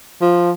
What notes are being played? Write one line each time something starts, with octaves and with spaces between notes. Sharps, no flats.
F3